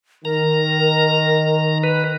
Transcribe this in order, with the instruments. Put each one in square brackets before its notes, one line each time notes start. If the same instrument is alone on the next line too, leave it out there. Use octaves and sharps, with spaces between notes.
[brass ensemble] D#3 [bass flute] A#4 [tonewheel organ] A#5
[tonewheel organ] B4